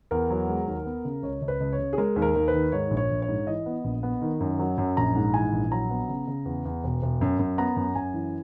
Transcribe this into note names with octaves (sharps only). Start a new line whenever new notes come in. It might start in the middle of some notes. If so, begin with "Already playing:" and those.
E2 A#4
F#3
G#3
D#2
B3
C#3
C#2 C#5
C#2
B4
C#2
C#5
C#3
G#4
G#3 A#4
D#2
A#4
D#2
B4
D#3
G#2 C#5
A#1
C#5
A#1
C#5
G#2
E3 D#5
B3
A#1
B3
D#3
F#2
F#3
F#2
A#1 A#5
G#2
E3 G#5
A#1
F#3 A#5
B3
C#3
C#3
E2
E2
E1
E1
F#2
F#2
B3 A#5
F#2
F#2 G#5
E3